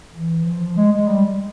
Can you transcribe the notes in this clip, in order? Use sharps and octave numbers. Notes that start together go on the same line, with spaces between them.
E3
F3
G#3
G#3
G3